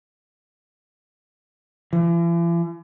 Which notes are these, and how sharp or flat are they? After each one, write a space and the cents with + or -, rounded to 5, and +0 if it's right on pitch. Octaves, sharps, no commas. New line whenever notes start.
E3 +45